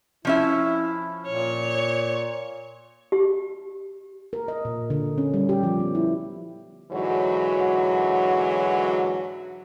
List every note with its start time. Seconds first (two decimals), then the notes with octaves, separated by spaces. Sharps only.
0.25 F3 C#4 E4 E5
1.27 A#2 C#5
3.12 G4
4.33 A#4
4.48 D#5
4.65 A#2
4.90 D3
5.18 C#4
5.34 G3
5.49 G4
5.63 F3
5.80 B3
5.95 E4
6.91 G#2 D3 E3 F#3 F#4 C#5